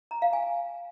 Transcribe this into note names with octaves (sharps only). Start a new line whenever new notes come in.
A#5
F5
G#5